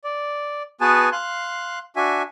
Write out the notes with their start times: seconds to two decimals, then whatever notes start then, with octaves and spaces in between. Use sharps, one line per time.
0.04 D5
0.81 B3 F#4 G#4 B4 G#5 A5
1.12 F5 C6 F#6
1.96 D4 F#4 E5 G#5